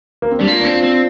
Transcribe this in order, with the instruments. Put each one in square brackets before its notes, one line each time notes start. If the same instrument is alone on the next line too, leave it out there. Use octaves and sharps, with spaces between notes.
[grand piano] A#3
C4
[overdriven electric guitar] G3 [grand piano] D4
[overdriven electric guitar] A#3 [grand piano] F4
[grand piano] D4
[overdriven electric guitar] C4
[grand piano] F4
[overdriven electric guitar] C4